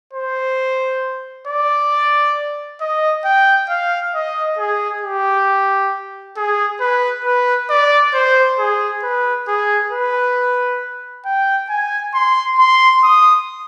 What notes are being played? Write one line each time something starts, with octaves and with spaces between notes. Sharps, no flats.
C5
D5
D#5
G5
F5
D#5
G#4
G4
G#4
B4
B4
D5
C5
G#4
B4
G#4
B4
G5
G#5
C6
C6
D#6